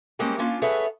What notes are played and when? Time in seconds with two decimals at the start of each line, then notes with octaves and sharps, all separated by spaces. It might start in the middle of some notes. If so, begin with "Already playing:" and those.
0.19 G3 G#3 A#3 C4 C#4
0.39 A#3 C#4 D4 F4
0.62 G#4 A4 B4 C#5 E5 F#5